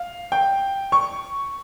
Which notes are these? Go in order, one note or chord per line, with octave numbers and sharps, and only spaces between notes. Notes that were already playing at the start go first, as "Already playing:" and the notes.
Already playing: F5
G5
C#6